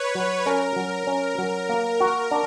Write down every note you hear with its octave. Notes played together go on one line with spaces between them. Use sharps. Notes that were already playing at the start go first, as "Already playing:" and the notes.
Already playing: B4 C#5
F#3
C#4 A#4
F#3
C#4
F#3
A#3
F#4
D4